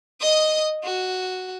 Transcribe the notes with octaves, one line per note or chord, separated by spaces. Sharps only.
D#5 D#6
F#4